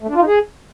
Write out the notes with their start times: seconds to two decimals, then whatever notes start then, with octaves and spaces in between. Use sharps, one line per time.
0.02 A3
0.09 D4
0.15 F4
0.21 D#4
0.27 G#4